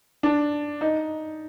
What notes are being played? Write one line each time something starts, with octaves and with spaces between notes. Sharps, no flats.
D4
D#4